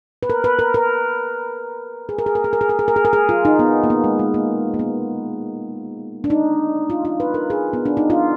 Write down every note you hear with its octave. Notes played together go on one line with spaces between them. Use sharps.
B4
A#4
B4
A#4
A#4
G#4
A#4
G#4
A#4
G#4
A#4
G#4
A#4
G#4
A#4
G#4
A#4
G#4
F4
D#4
B3
A#3
B3
G#3
G#3
A#3
A#3
B3
D4
D#4
F4
F4
B4
A#4
G#4
B3
D4
D#4
F4